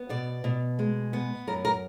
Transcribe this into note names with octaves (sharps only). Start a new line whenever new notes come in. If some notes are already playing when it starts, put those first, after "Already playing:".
Already playing: B3
B2 D5
B2
G#3
B3
F#2 A#4
A#4